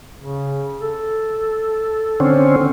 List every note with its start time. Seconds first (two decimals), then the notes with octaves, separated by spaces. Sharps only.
0.21 C#3
0.82 A4
2.20 D3 C4 C#4